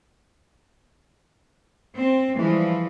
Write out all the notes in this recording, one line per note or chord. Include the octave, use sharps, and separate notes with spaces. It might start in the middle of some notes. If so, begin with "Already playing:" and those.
C4
E3 F3 G3 G#3